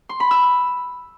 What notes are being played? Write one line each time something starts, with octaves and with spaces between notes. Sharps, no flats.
C6
B5
E6